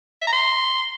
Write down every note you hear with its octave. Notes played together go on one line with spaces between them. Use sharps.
E5
A#5
C6